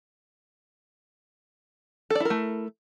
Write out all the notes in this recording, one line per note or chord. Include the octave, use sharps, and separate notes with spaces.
A3 E4 A4 A#4 D5